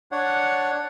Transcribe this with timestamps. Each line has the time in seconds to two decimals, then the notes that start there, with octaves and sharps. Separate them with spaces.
0.12 D4 C#5 F#5